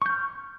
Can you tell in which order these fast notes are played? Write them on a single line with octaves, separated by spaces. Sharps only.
C#6 G6 F6